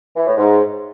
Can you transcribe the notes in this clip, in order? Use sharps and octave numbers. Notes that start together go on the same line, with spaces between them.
E3
A2
G#2